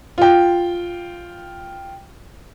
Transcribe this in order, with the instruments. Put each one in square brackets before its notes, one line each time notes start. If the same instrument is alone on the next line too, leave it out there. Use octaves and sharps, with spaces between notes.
[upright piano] F4 G5